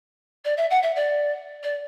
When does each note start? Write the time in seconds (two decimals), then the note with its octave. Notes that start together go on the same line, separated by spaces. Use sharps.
0.44 D5
0.57 E5
0.70 F#5
0.82 E5
0.95 D5
1.63 D5